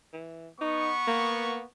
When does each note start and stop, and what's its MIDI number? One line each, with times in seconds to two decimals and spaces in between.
0.13 0.48 52
0.61 1.65 59
0.61 0.91 63
0.61 1.65 85
1.07 1.62 58